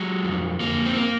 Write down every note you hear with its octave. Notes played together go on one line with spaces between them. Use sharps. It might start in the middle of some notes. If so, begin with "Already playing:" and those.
Already playing: F#3 G#3
F2
F2 A#3
C4
A#3